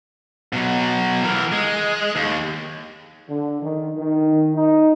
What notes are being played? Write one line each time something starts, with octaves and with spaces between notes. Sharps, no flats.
B2 F#3
E3 A#4
G#3
D#2
D3
D#3
D#3
D#4